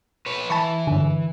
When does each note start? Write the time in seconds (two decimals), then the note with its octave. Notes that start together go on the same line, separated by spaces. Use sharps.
0.26 B4 C#5
0.50 E3 A5 B5 C#6
0.87 G2 D3